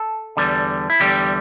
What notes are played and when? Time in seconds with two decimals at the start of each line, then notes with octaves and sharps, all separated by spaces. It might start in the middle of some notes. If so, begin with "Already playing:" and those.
Already playing: A4
0.37 E2 D3 G3
0.90 E4
1.00 E2 D3 G3 G4